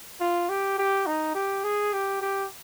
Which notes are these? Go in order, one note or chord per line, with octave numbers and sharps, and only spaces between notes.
F4
G4
G4
D#4
G4
G#4
G4
G4